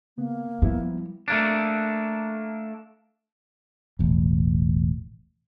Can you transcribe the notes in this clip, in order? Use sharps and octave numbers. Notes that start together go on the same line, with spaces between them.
C#3 A#3 B3
F3 G3 B3 E4
A3 A#3 D4
E1 A1